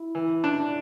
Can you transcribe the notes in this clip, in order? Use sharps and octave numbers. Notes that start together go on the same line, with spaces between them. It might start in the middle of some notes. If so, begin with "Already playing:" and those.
Already playing: E4
E3
D4